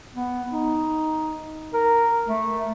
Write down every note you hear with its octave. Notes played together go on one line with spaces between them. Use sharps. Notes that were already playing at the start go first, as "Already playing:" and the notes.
B3
D#4
A#4
A3